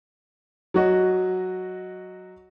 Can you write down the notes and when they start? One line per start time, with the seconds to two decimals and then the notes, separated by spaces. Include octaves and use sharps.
0.74 F#3 F#4 D#5